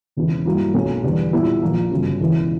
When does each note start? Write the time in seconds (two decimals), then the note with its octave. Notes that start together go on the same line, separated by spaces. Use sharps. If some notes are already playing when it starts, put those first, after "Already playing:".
0.17 E1 E2 C#3 E3
0.45 G2 F#3 A#3 E4
0.74 B1 B2 A#3 C#4
1.03 E1 E2 D3 G3
1.33 A#2 G3 B3 E4
1.62 A#1 A#2 A#3
1.91 G1 F#2 C#3
2.20 E1 E2 C#3 E3